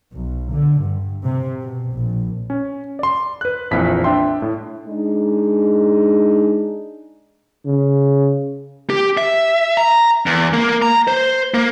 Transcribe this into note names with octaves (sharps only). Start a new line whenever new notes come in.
B1
D3
G2
C3
B2
A#1
C#4
D5 C6
B4 F#6
A#1 F2 E3 B6
D4 E5 G5 C6
A2
G#3 D4 D#4 G#4
C#3
G4
E5
A#5
E2
A#3
A#5
C5
A#3